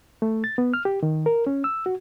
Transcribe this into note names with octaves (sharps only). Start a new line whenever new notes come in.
A3
A6
B3
F6
G4
D#3
A#4
C#4
E6
F#4